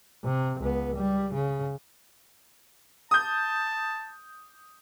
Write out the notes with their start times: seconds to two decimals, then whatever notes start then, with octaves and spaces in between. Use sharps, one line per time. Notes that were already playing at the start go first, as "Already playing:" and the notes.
0.25 C3
0.60 C#2 B3
0.96 G3
1.34 C#3
3.11 A5 D#6 G6